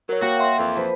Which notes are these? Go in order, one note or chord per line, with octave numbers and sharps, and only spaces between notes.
F#3 A#4 C#5
A#3 F#4 G5
E5 C6
F2 E3
F3 B4